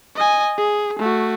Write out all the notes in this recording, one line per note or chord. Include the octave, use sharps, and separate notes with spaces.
D#5 G#5
G#4
A3 F#4